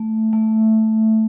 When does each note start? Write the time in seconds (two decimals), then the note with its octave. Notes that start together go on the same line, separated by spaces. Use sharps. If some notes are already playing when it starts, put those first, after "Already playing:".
Already playing: A3
0.33 A3